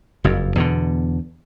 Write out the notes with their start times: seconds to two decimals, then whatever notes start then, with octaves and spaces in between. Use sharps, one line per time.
0.24 F#1 F2
0.56 E2 B2 D3